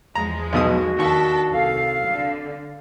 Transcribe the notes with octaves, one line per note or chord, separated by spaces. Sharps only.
E2 F3 G#3 A#5
B1 B2 F#4 D#6
D#2 D4 A4 C#6 B6
C2 A4 F5
D3